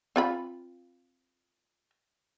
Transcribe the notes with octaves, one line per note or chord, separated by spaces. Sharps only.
C4 F4 B5